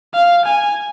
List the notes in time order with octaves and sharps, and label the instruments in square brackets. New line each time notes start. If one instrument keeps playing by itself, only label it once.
[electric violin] F5
G#5